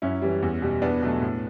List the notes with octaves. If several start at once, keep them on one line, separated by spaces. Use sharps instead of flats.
F#2 C#4 E4
E3 G3
E2
B2 G3
E2 B3 D4
B2 F#3 A3
A2